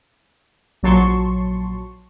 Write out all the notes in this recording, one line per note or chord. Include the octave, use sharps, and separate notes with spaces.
A#1 F#3 A5 C6 C#6